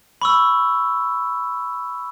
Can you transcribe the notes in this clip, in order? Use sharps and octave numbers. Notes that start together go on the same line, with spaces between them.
B5 C#6 E6